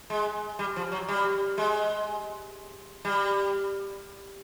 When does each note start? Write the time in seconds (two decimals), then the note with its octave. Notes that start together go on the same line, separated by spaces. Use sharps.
0.10 G#3
0.59 G3
0.76 F3
0.92 F#3
1.08 G3
1.58 G#3
3.05 G3